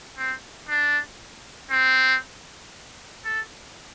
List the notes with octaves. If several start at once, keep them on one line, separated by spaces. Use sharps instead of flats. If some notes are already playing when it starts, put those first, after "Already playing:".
C4
D4
C4
A4